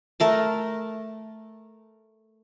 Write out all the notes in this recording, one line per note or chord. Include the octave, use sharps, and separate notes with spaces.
A3 A#4 A5